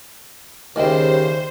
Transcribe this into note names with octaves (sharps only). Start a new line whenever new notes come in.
D#2 C#3 G3 C5 D#5 E5 G5